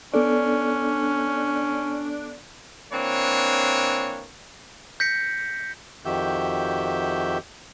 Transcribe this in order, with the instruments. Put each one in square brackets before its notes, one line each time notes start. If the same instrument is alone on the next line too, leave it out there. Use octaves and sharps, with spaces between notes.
[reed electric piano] B3 A4 D5 [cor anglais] C#4 [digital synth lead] D4
[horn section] E3 A#3 C4 D4 C#5
[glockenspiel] G6 A#6 B6 C#7
[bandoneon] F2 D#3 F#4 G4 E5 G6